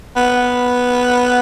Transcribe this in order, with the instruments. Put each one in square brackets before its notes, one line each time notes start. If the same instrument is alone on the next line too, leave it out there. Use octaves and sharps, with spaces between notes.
[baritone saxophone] B3